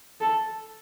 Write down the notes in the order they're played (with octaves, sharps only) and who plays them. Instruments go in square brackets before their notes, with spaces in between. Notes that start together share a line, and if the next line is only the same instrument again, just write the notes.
[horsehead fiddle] A4